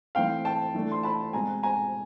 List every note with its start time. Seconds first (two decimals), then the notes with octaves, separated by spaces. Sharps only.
0.15 E3 A3 C4 F5 G5
0.45 G5 A5
0.75 E3 A3 D4
0.92 C6
1.03 A5 B5
1.33 B2 G#3 C4 G#5 A#5
1.63 G#5 A#5